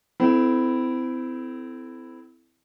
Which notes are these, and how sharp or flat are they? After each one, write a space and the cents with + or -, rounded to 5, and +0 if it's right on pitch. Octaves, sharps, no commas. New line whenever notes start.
C4 -30 E4 +0 A4 -10